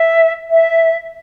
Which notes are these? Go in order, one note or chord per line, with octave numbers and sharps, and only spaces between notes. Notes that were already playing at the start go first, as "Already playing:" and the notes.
Already playing: E5
E5